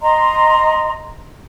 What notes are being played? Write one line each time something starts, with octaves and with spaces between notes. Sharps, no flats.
D#5 A#5 C6